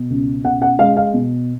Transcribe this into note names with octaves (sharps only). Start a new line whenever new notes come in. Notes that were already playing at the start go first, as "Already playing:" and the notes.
Already playing: B2
C#2
B2 F#5
F#5
G#3 F5
F5
B2